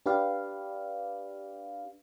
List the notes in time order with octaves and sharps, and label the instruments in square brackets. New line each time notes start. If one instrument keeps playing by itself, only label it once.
[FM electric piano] D4 G4 B4 D5 F5